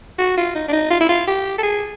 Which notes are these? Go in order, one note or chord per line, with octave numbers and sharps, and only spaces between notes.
F#4
F4
D#4
D4
D#4
F4
E4
F4
G4
A4
G#4